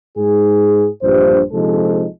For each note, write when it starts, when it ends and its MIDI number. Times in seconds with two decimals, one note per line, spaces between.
0.18 0.87 44
0.18 0.87 68
1.03 1.41 34
1.03 1.41 43
1.03 1.41 72
1.53 2.05 34
1.53 2.05 48
1.53 2.05 53
1.53 2.05 56
1.53 2.05 63
1.53 2.05 69